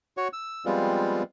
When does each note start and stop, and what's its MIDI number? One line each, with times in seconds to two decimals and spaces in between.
0.17 0.28 66
0.17 0.28 73
0.17 0.28 85
0.33 0.65 88
0.66 1.23 53
0.66 1.23 55
0.66 1.23 56
0.66 1.23 59
0.66 1.23 60
0.66 1.23 65